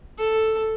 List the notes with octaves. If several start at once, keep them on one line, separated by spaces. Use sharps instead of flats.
A4